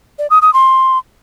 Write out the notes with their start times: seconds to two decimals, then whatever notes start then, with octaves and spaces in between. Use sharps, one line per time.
0.19 D5
0.30 D#6
0.42 D#6
0.54 C6